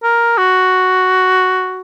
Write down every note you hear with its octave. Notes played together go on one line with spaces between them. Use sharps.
A#4
F#4